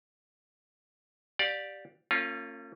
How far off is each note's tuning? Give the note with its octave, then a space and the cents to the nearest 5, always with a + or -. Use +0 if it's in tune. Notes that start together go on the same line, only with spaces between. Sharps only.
G4 +0 D5 +0 F5 +35
A#3 -45 C#4 -25 F4 +0